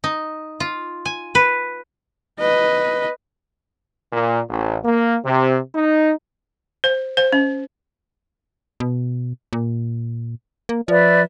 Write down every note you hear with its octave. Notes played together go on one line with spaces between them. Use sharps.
D#4
F4
G#5
B4
B4 D#5
A#2
A1
A#3
C3
D#4
C5
C5
C#4
B2
A#2
A#3
F3 B4 D5 E5